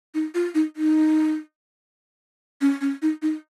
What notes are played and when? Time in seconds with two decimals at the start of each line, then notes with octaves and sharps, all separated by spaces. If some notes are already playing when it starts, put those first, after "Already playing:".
0.14 D#4
0.34 F4
0.54 D#4
0.76 D#4
2.61 C#4
2.81 C#4
3.02 D#4
3.22 D#4